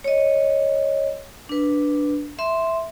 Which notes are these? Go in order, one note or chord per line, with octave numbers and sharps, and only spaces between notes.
C#5 D#5
D4 B4
E5 C6